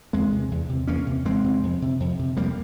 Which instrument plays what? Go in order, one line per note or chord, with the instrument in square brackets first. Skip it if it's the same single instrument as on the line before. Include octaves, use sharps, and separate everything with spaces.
[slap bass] E2 G#3 C4
C3
E2
C3
E2 A#3 C#4
C3
E2 G#3 C4
C3
F2
C3
F2
C3
F2 G3 A#3